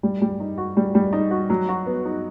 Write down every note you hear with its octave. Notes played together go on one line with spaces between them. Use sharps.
G3
G3
D#4
F#4
G3
G3
D#4
F#4
F#3
F#4
B3
D#4